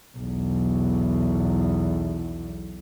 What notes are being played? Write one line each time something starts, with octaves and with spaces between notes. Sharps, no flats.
B1 E2